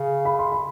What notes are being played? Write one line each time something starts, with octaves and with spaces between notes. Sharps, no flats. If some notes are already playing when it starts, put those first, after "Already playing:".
Already playing: C#3
B5
C6
B5